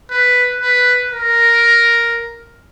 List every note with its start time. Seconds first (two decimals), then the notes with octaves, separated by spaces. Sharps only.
0.11 B4
0.61 B4
1.12 A#4